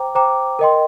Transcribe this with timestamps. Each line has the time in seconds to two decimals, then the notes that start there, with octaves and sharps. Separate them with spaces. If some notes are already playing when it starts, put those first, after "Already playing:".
Already playing: C5 G5 A#5 D6
0.15 C5 G5 A#5 D6
0.59 A#4 D#5 G5 C6